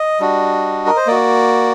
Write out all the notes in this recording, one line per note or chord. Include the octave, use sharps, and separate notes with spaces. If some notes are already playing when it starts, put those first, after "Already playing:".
Already playing: D#5
G3 D4 F#4
A#4
C5
A#3 F#4 D5